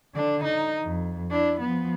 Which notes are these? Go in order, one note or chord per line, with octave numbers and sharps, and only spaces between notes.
D3 D4
D#4
F2
D4 E4
F3 B3